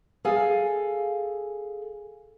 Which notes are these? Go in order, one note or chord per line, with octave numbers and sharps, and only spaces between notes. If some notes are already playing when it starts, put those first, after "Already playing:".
G#4 A4 F5 G#5